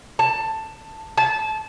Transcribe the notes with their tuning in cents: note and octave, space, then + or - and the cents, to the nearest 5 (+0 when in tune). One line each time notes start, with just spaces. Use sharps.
A5 +10
A5 -20